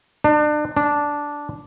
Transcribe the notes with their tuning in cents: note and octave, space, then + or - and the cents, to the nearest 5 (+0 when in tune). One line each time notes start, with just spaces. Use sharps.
D4 +35
D4 -5